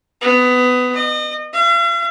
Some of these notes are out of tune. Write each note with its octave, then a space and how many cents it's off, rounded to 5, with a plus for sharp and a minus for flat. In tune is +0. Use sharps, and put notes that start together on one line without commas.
B3 +20
D#5 -35
F5 -45